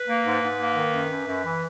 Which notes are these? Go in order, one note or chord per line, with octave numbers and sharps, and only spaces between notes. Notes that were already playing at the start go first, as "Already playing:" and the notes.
Already playing: B4
A#3
G#2
G#2
A#3
D#3
F#2
F#2
F#2
E3